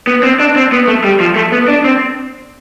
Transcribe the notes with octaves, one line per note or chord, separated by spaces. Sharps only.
B3
C4
D4
C4
B3
A3
G3
F3
A3
B3
D4
C4